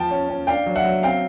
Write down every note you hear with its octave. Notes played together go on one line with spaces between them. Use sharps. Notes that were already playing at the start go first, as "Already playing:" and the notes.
Already playing: F3 G5 A5
C#4
C#4
D4 F5 G5
F#3
E5 F#5
F#3
C4 F5 G5